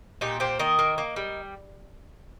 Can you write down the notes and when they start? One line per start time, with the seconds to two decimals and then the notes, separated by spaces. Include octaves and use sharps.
0.21 A#2 D#4 G4
0.40 A#3 G4 C5
0.59 D#3 A#4 D#5
0.79 A#3
0.98 A#3
1.16 G3